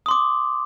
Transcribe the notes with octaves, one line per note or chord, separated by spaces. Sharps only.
C6 D6 D#6